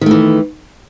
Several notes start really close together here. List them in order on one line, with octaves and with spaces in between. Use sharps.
D#3 A3 E3